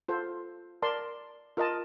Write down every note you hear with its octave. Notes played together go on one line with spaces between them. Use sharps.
F4 A4 C5
A#4 D5 A5 C6
F4 A#4 D#5 A5